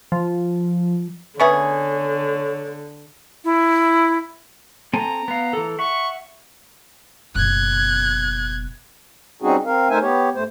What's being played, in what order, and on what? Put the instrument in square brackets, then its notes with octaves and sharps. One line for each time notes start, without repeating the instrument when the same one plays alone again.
[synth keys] F3
[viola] D3 [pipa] B3 C#4 G#4 [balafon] B4 E5 C#6 [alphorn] C#5
[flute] E4
[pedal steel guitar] C4 A4 G#5 [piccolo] A#5
[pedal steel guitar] B3 F5
E3 A4
[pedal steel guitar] E5 F#5 [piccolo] C#6
[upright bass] F#1 B2 [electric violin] F#6 G#6
[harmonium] G3 C4 C#4 D#4 F#4 G#4
C4 A#4 F5
A3 D#4 A#4 C5 E5 G#5
B3 G4 C#5
G2 A3 C5